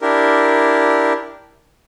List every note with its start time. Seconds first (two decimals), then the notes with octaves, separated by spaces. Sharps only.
0.01 D4 E4 G4 A#4